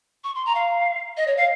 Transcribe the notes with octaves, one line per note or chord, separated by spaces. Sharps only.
C#6
C6
A#5
F5
D#5
C#5
F5